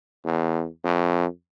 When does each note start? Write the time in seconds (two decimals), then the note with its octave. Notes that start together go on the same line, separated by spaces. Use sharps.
0.25 E2
0.84 F2